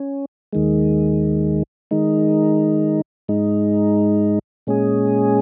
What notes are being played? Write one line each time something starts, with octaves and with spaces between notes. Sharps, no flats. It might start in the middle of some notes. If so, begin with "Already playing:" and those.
Already playing: C#4
D#2 D#3 G#3
D#3 G#3 D#4
G#2 G#3 D#4
A#2 G#3 C#4 G#4